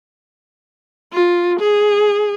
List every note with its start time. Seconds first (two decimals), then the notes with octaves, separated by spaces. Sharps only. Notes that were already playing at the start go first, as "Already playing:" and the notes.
1.13 F4
1.60 G#4